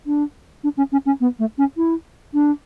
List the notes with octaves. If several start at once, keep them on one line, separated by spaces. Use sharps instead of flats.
D4
D4
C#4
C#4
C#4
B3
A3
C#4
E4
D4